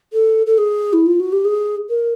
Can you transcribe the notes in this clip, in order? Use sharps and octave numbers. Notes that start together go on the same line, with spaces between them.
A4
A4
G#4
E4
F4
F#4
G4
G#4
A#4